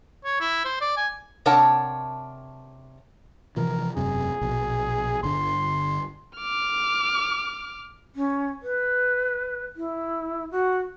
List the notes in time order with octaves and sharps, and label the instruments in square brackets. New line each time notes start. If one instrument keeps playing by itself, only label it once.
[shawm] C#5
E4
C5
D5
G#5
[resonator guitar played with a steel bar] C3 D4 A#4 C#5 F#5 A5
[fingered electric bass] C3 E3 F3 [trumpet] A#4
[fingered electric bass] E1 F#2 C3 [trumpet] G#4
[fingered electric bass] A#1 B2
[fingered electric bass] G1 D3 [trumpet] C6
[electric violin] D6 F6
[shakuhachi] C#4
B4
E4
F#4